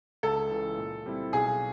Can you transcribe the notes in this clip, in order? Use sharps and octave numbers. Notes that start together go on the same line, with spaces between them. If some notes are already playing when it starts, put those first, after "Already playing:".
C#2 A4
C#3 E3
A#2
G3 C4 E4
B1 G#4